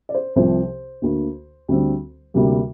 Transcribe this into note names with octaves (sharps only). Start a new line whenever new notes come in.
D5
C5
C2 C3 F3 C5
D2 D3 A#3
D2 D3 G3 C4
D2 C3 G3 A#3